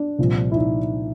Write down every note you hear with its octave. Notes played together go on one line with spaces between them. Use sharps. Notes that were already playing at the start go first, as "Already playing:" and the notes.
Already playing: D4
C2 A#2 F3
E4
D#4